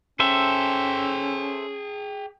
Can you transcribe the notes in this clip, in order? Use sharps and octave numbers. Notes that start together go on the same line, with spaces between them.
C#4 G#4 A4 C5 E5 G5